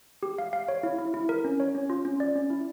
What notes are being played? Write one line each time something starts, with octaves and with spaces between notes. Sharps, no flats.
G4
F5
F5
C#5
E4
E4
E4
A#4
C#4
C#5
C#4
F4
C#4
D5
C#4
E4